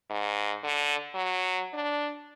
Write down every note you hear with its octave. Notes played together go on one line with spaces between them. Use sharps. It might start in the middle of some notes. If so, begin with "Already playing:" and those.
G#2
D3
F#3
D4